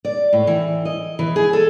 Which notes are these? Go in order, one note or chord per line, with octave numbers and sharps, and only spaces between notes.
D5
A2
E3
D#5
E3
G#4
A4